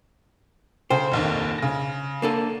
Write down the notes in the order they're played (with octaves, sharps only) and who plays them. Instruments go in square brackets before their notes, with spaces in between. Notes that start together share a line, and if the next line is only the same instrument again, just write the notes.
[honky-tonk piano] C#3 A4 G5 [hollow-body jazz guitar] C5
[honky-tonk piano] F1 A#1 D#2
C#3 A#6
[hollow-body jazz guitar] A#3 D4 A4